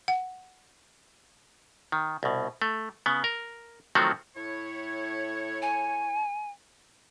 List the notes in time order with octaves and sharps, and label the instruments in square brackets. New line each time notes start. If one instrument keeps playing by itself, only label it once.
[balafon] F#5
[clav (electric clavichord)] D#3
C2 B2
A3
C#3 B3
A#4
D#3 F3 F#3 A3 C4 F#4
[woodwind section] A2 E4 C#5
[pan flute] G#5